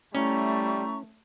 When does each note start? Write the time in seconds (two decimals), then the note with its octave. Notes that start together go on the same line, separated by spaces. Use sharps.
0.15 G3 A3 C#4 E4 A#5 C#6